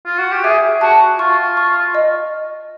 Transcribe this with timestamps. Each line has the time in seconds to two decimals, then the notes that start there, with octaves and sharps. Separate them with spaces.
0.06 F4
0.18 F#4
0.31 G4
0.44 G#4 E5
0.81 F#4 A5
1.19 F4 C#6
1.57 C#6
1.95 D#5